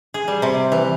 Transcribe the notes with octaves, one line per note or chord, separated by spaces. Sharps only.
G#4
G3
C3
E3